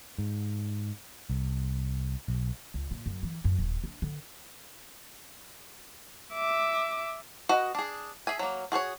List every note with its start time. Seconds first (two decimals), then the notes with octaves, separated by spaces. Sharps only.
0.18 G#2
1.30 C2
2.28 B1
2.74 C#2
2.91 A#2
3.06 F#2
3.23 E3
3.45 F#2
3.58 D#1
3.84 D4
4.02 D3
6.33 E5 D6
7.49 F#4 B4 D#5
7.75 D4 G#4
8.27 G#4 E5 G#5
8.39 F#3 A#3
8.72 F#4 G#4 C5 C#5